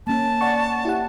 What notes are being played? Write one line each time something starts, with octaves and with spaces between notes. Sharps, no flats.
A#3 C#4 A5
D5 F#5 C#6
E4 G4 F#5